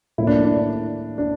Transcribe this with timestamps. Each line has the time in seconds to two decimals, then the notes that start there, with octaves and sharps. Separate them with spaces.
0.18 A2 F3 A#3 E4
0.27 D4
0.45 D4
1.18 D4